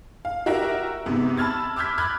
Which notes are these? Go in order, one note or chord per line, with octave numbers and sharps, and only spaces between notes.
F5
F#4 G4 A#4 E5 A#5
G#2 C3 B3
A5 B5 E6 F6 G#6 A6
D6 E6 F6 G6 G#6 B6
B5 D6 F6 F#6 G#6 A6